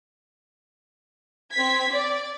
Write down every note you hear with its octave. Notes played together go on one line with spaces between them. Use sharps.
C4 G#6 B6
D5